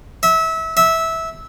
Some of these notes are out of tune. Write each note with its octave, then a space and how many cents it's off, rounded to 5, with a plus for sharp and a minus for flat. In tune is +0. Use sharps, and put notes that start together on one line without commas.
E5 -25
E5 -15